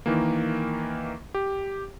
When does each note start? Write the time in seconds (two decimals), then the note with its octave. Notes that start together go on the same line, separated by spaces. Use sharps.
0.06 D#3 E3 A#3
1.34 G4